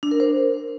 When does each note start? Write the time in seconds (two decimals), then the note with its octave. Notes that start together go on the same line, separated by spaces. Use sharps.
0.03 D4
0.11 A#4
0.20 C5